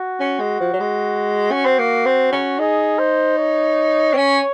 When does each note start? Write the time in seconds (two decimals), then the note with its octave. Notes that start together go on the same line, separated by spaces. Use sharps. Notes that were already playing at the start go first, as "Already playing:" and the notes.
Already playing: F#4
0.20 C#4
0.40 G#3
0.60 F3
0.74 F#3
0.80 G#3
1.51 C#4
1.65 C4
1.79 A#3
2.06 C4
2.32 C#4
2.59 D#4 G#4
2.99 C5
3.38 C#5
4.13 C4
4.17 C#4